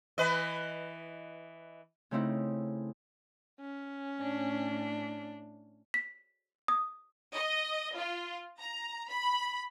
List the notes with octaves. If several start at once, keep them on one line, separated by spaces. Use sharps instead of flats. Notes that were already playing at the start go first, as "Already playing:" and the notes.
E3 B4 D#5
C#3 A3 C4 D#4 E4
C#4
A2 D4
B6
D#6
D#5
F4
A#5
B5